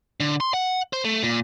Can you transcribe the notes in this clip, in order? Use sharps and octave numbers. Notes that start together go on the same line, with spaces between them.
D3
C6
F#5
C5
A3
A#2